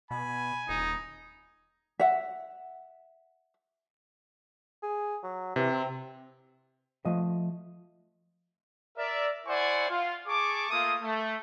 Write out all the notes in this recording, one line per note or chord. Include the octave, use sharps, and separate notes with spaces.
B2 G#5 B5
D#1 D#4
E5 F#5
G#4
F#3
C3 E3
C4
F3 A3 D#5 F5
A#4 D5 E5
E4 C5 D5 F#5 G#5 C#6
F4
G#4 A5 C#6 D6
A3 A#3 F4 D#6
A3